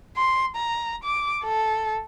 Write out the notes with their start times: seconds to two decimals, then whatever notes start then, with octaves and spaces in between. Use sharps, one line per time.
0.17 C6
0.56 A#5
1.04 D6
1.44 A4